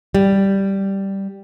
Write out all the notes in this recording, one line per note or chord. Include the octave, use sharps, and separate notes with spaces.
G3